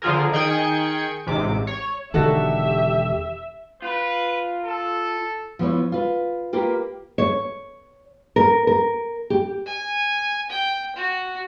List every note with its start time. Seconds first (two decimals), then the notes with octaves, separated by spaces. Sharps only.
0.02 D3 F3 F4 G#4 A#4
0.32 D#3 G#4 G5 G#6 C#7
1.26 A1 G#2 C3 D6
1.67 C#5
2.14 E1 D3 D#3 F#4 G4 A4 E5
3.82 F4 B4
4.64 A4
5.59 F3 B3 E4 C#5
5.92 F4 B4
6.53 A#3 F4 G4 A#4 B4
7.18 C#5
8.36 A#4
8.67 A#4
9.30 G4
9.67 G#5
10.50 G5
10.96 F#4